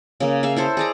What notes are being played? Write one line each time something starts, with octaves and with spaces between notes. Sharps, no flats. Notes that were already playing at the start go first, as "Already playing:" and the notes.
C#3 A#3
G#4 E5 F5
E4 A4 C5
G#4 D5 A#5